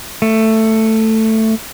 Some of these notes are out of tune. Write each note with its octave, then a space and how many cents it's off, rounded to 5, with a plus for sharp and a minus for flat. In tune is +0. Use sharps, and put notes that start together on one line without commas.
A3 +10